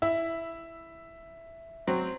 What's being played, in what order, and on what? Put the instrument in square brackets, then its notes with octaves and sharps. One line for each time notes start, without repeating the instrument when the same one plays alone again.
[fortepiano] E4 [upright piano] E5
[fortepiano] F#3 C4